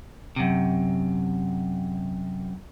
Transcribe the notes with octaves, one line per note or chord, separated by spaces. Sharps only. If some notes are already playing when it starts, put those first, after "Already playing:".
F#2 C3